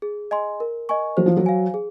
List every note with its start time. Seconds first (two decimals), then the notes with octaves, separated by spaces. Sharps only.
0.02 G#4
0.31 D#5 G#5 C6
0.60 A#4
0.89 D#5 G#5 C#6
1.17 F#3 C5
1.26 F3
1.37 F#3
1.46 F5 G#5
1.74 G#4